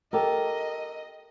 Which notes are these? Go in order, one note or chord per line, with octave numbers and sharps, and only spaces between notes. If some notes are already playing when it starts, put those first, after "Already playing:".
G4 A4 A#4 D#5